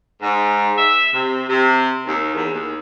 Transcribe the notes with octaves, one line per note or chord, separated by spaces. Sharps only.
G#2
E5
C3
C3
D#2
E2
D#2